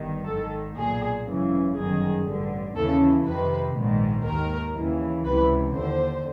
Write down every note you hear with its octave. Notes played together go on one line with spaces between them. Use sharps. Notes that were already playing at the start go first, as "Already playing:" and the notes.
Already playing: G1 G2 D#3
G#1 G#2 D#3 A4
B1 A#2 G#4
G#1 F#2 C#3 E3
G1 F#2 D#3 G#4
A1 G2 D3
D#2 C#3 E3 A4
F2 C3 D#3 B4
A#1 G#2 D#3
D#2 D#3 A#4
D#2 C#3 E3
C#2 C3 E3 B4
D#2 D3 C5